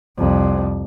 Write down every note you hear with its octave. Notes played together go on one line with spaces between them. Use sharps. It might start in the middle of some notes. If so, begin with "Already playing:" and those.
C2 F2